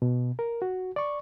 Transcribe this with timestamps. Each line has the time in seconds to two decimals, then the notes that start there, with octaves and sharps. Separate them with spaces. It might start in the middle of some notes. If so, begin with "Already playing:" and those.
0.02 B2
0.39 A#4
0.62 F#4
0.96 D5 C#6